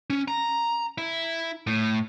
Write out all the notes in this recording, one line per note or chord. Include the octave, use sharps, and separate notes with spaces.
C#4
A#5
E4
A2